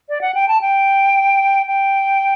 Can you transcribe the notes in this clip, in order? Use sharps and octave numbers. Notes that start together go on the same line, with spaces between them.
D5
F#5
G5
A5
G5
G5